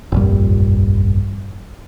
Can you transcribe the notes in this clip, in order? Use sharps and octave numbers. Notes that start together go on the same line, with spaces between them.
F1 A#1 G2